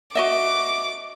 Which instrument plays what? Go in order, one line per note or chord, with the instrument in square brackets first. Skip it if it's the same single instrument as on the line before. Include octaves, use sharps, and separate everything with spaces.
[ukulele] F#4 D#5 E5 [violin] D6